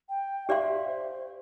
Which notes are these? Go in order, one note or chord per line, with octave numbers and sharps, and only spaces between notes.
G5
G4 D5 E5 F5 C6
C5